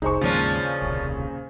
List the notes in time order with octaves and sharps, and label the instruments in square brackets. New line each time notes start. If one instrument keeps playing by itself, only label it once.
[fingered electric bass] F1 C2 [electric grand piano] D#4 [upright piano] G#4 C5 C#6
[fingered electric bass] D#2 G#2 [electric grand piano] C#3 A#3 [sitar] F3 C#4 D4
[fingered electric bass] D#1 C2